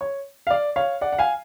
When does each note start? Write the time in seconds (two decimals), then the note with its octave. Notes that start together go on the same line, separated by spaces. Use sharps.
0.01 C#5
0.47 F5
0.51 D5
0.76 C#5 F5
1.01 D5 F#5
1.13 F#5
1.18 F5 G#5